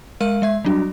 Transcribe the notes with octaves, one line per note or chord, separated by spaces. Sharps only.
G#3 A#4 F5 F6 D#7
G#3 E5 G#6
F#3 G3 D4 F#4